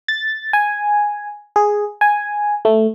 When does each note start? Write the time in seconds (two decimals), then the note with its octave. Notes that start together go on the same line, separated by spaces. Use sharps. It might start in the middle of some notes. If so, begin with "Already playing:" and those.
0.08 A6
0.53 G#5
1.56 G#4
2.01 G#5
2.65 A3